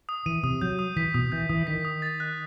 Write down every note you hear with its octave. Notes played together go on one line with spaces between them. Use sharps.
D#6
E3 D#7
C3 D#6
F#3 G6
D#6
E3 B6
B2 D#6
E3 G6
E3 D#6
D#3 B6
D#6
A6
F#6